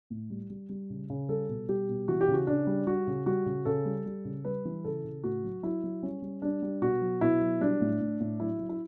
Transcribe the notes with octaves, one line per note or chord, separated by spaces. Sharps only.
A2
G3
G3
G3
C#3
C#3
G3 A4
B2
G3 G4
B2
E3 F#4
G4
C#3
F#4
C#3 D4
G3
G3 F#4
C#3
G3 F#4
C#3
C#3 A4
G3
G3
C#3
G3 B4
E3
C#3 A4
C#3
A2 F#4
F#3
F#3 E4
F#3
G3 C#4
G3
G3 D4
G3
B2 F#4
F#3
B2 E4
F#3
G3 D4
A2
A2
A2
F#3 E4
F#3
E4